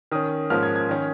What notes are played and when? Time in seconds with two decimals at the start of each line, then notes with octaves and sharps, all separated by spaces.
0.12 D#3 C#4 D#6
0.50 G#2 F3 A#3 C#4 F6
0.63 G#6
0.76 G#6
0.89 D#3 C#4